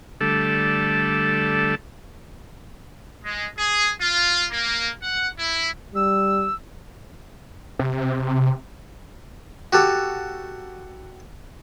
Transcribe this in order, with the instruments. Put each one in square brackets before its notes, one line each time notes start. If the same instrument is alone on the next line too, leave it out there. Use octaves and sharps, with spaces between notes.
[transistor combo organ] D3 G3 A3 A4
[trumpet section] G#3
G#4
F4
A#3
F#5
E4
[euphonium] G3 [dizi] E6
[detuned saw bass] C3
[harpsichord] F#4 G4 A4